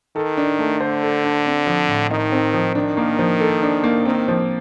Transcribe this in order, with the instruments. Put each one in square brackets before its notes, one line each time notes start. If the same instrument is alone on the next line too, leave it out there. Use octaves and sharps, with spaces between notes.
[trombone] D#3 [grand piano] A4
[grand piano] D4
A3
[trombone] D3 [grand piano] C5
[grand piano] A4
D4
C4
F3
A2
[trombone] D#3 [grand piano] D#4
[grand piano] C4
F3
[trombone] D#3 [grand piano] D4
[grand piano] A#3
F3
A4
D4
A#3
[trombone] D#3 [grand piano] C4
[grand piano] F3